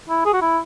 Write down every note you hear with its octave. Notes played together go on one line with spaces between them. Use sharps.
E4
G#4
F#4
E4